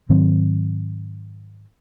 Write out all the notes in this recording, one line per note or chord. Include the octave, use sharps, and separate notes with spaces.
G#2 D#3 F#3 C4